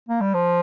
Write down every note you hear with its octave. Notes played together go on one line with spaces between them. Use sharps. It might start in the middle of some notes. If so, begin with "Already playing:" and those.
A#3
G3
F3